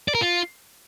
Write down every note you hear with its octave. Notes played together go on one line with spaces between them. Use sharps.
D5
A#4
F4